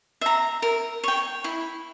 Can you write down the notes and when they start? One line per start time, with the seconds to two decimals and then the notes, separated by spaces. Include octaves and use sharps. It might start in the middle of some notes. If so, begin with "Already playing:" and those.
0.21 E5 A#5
0.62 A#4
1.04 C#5 G5
1.44 E4